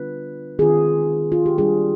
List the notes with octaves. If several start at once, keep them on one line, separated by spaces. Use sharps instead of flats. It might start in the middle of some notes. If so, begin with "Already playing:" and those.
Already playing: D3 G3 B3 D4 F4 B4
D#3 G#3 C4 F4 G#4
F4
G4
G3 D4 F4 G#4